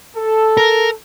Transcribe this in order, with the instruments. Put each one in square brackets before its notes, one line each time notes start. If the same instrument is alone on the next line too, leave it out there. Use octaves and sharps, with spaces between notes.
[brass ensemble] A4
[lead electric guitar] A#4